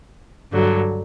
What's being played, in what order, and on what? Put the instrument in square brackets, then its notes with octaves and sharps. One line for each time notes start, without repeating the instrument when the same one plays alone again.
[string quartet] G2 D3 F#3